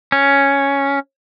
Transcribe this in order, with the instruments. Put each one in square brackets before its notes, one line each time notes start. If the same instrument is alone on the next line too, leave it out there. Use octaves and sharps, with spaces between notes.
[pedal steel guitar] C#4